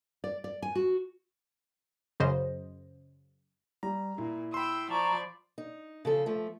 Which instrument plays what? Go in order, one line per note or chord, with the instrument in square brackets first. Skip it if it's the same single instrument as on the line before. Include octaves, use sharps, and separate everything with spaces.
[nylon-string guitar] D5
D5
G#5
F#4
[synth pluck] F#2 C#3 C5 D#5
[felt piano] G3 [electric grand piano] A#5
[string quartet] A#2 [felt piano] E4
[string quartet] G5 E6 [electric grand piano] B5 C6
[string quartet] F3 D5 [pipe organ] A5 A#5 C#6
[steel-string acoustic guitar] D#4
C#3 F3 A4
F3 A3